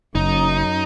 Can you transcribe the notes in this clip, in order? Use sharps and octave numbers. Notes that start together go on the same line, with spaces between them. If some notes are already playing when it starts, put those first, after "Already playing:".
F#1 F#2 D#4